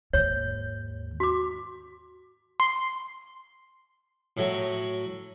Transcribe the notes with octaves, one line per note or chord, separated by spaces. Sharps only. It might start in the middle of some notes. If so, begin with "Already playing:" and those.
D#2 G#2 C#5
F#4 D6
C6
A2 F#3